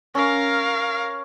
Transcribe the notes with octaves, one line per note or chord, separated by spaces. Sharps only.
C#4 A#4 F5